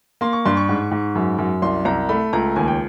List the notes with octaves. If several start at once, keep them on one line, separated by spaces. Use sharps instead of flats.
A#3 C6
C#6
G2 C6
C#6
G#2
G#2
F#2
F#2
C2 C6
C2 A#5
A3 B5
C#2 A#5
D#2 G#5
G5